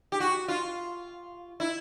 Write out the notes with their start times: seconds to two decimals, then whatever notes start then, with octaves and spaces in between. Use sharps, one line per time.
0.12 G4
0.20 F#4
0.48 F4
1.60 E4